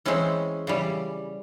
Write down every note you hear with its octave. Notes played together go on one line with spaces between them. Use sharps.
E3 G#3 C4 C#4
C#3 E3 G3